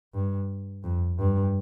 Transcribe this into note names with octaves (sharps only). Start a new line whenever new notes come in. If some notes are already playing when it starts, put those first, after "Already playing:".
G2
F2
G2